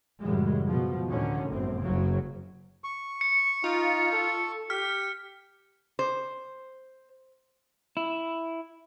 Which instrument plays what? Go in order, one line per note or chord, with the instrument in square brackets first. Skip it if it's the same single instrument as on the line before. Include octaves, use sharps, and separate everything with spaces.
[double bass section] F#2 A2 C#3 E3 G3 G#3
B2 F3
D2 A2 D3 D#3 C#4
G1 F#2 A2 C4
F#1 F#2 C#3 F#3
[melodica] C#6
[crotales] C#7
[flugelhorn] D#4 [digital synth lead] F4
[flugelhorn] A4
[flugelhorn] G4 [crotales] F6 [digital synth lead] B6
[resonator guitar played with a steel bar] C5
[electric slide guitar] E4